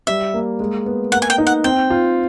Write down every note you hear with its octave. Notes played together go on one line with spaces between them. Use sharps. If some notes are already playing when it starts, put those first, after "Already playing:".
G3 E5
A#3
G#3
B3
A#3 F#5
G#5
G5
D#4
F#5
C4 G5
F4